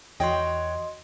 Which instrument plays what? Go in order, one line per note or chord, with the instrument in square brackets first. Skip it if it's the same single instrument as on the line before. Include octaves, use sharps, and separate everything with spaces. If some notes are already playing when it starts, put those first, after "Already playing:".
[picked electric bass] E2 [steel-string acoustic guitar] F#4 C#5 G5 [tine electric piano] D#5 C6